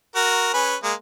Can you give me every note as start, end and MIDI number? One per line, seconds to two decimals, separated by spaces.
0.16 0.50 66
0.16 0.50 70
0.54 0.76 61
0.54 0.76 68
0.54 0.76 71
0.83 0.93 56
0.83 0.93 58